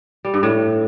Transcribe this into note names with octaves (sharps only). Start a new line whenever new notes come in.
G3
G2
A2